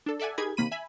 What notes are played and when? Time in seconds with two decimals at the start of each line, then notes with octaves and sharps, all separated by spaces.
0.06 D4 A4
0.20 A4 D5 E5 F#5 G#5
0.38 D#4 G4 G#4 A#4 B5 G#6
0.57 C3 D#3 A#3 B5 D#7
0.71 E5 G#5 B5